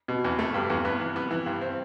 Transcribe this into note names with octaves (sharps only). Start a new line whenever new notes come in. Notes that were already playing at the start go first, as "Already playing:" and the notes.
B2
E2
A3
G2
E2
B3
E3
B3
E3
G2
C4